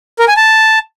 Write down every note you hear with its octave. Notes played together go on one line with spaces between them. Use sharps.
A#4
G#5
A5